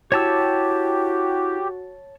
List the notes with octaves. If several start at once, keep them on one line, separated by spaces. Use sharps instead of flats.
E4 F#4 G4 C#5 A5 E6